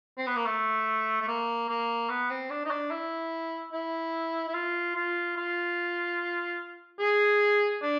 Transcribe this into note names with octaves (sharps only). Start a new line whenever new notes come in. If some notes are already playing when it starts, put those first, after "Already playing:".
C4
B3
A#3
A3
A3
A#3
A#3
B3
C4
D4
D#4
D4
E4
E4
E4
F4
F4
F4
G#4
D4